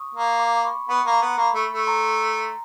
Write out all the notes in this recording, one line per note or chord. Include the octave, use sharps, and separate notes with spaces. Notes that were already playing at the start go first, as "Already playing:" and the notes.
Already playing: C#6 D#6
A#3
C6 D6
B5 C#6
B3 B5 C#6
A#3
A#5 C6
B3
A#3 B5 C#6
A3
A3
A#5 C6